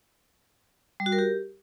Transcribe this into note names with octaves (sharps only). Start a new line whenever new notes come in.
G3
F#4
A#4
G4